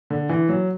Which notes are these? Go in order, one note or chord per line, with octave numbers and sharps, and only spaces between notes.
D3
E3
F#3